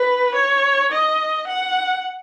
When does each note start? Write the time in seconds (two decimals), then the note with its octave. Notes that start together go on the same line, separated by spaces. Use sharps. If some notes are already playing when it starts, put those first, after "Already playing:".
Already playing: B4
0.35 C#5
0.92 D#5
1.48 F#5